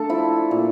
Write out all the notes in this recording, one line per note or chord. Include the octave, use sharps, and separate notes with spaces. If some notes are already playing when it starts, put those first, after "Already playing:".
Already playing: A3 D4 A4
F3 E4
A#2